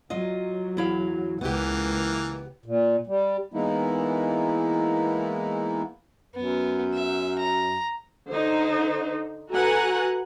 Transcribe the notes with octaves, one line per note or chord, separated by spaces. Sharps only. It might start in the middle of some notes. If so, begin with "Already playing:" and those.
F#3 F4 D#5
E2 E4 F5
C#2 E3 A#3 B3 G4
A#2
G3
E3 G#3 A#3 B3 D#4 E4
F#2 B3
E5
A#5
D3 D#4 C5
F#4 A4 B4 F#5 G#5 A#5